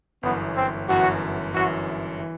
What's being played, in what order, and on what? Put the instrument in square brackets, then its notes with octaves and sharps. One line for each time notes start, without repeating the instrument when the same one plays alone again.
[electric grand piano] G1 F#2 E3 [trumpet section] B3
[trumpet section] C4
[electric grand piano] G1 F#2 E3 [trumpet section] F#4
[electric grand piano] G1 F#2 E3 [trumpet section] F#4
[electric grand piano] E3